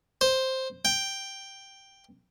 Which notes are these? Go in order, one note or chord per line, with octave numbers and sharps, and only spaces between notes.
C5
G5